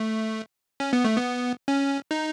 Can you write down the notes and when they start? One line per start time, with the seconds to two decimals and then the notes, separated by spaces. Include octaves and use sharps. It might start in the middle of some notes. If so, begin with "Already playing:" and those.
Already playing: A3
0.80 C#4
0.93 B3
1.05 A3
1.17 B3
1.68 C#4
2.11 D#4